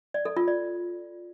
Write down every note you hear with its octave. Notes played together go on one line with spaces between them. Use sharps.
D5
A4
F4
D5